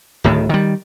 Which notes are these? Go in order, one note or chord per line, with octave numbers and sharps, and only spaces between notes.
D1 A2 D#3
D#3 G3